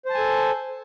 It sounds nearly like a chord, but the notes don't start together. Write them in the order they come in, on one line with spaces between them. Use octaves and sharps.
C5 A5 G#5 A4